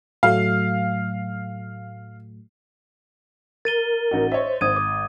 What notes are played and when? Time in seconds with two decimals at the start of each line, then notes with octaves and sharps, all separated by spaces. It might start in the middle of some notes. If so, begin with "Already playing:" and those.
0.23 A2 F#3 A3 F5
3.65 A#4 A6 D#7 G7
4.11 A1 D#4 F#4
4.32 C5 C#5 D#5 E5
4.61 G#1 D#6 G#6 D#7
4.76 D6